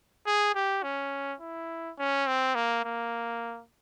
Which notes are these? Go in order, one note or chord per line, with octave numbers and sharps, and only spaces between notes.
G#4
G4
C#4
E4
C#4
C4
A#3
A#3